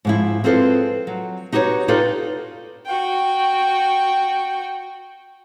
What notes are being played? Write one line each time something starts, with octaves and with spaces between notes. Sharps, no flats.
G#2 F3 E4
C4 F4 G#4 A4 B4 C5
F#3
D#4 F#4 G4 B4 C#5
D#4 F4 G4 A4 B4 D5
F#4 G5